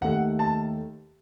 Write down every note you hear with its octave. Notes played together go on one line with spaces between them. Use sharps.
D#2 D#3 A3 F#5
A5